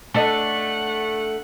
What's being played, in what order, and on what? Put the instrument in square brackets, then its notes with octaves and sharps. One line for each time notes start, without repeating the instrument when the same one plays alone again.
[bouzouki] A3 [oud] D4 A4 D#5 [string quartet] F#5